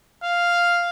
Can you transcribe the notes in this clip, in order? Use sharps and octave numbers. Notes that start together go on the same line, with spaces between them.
F5